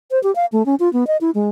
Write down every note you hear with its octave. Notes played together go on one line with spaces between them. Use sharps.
C5
G4
F5
A3
C#4
F4
B3
D#5
E4
G#3